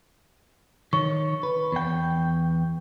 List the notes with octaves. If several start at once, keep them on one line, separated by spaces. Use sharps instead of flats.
D#3 C#5 C#6
B4
E2 G5